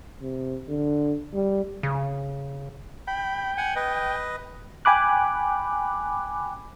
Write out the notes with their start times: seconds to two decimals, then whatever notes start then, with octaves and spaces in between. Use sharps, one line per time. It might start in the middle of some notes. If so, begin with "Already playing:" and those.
0.22 C3
0.68 D3
1.34 G3
1.83 C#3
3.08 G5 B5
3.57 F#5 G#5
3.76 B4 D#5
4.85 G5 G#5 B5 D6 F#6